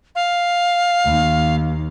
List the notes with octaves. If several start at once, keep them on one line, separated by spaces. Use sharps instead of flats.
F5
D#2